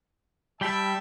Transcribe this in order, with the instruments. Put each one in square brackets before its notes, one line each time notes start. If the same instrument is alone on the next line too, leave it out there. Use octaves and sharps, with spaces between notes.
[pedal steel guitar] G3 G5 B5 [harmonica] E5 A5